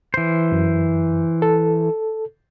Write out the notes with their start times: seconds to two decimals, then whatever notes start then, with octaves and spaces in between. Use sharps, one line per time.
0.14 E3 C5
0.52 F#2
1.42 A4